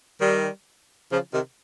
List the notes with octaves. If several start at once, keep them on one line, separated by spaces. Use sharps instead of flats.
D#3 G3
C#3 F3
C3 D#3